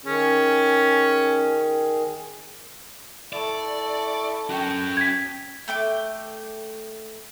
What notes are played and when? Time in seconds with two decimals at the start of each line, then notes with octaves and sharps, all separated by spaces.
0.06 D#3 C#4 G#4
3.33 E4 A4 D5 C#6
4.50 C#4 F#4 G5
4.97 G#6 B6
5.68 A3 G5 D6